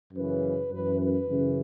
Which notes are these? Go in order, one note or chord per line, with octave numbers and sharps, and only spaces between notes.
F#2 C#3 E3 B4
F#2 E3 B4
B4
F#2 C#3 E3